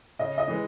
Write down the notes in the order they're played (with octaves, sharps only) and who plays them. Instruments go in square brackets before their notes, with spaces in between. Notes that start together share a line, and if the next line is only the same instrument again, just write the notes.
[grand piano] C#3 [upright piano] D#5
[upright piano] D#5
[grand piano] E3 G#3